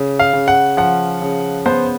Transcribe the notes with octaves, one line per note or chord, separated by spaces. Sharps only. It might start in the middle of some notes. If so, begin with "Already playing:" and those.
Already playing: C#3
F5
C#3
F#5
F3 F#5
C#3
B3 C5